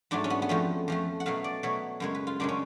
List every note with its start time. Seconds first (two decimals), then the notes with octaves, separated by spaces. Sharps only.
0.11 G#2 F#3 A3 D4
0.24 C#4
0.30 B3
0.42 B3
0.49 F2 F3 A3 C#4
0.88 F2 F3 A3
1.20 F#5
1.26 B2 F#3 A3 F5
1.44 D5
1.63 B2 F#3 A3 C#5
2.00 F#2 C#3 G#3 C#5
2.15 B4
2.27 F4
2.40 F#2 C#3 G#3 D4
2.49 C#4